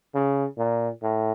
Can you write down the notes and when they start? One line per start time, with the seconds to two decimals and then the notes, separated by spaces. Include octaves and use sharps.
0.15 C#3
0.58 A#2
1.03 A2